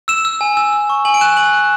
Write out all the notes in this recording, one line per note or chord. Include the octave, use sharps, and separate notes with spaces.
E6 E7
E6
G#5
E6
E6
C#6
G#5 F#7
D7
F#6 E7
G#5 F#7
F#6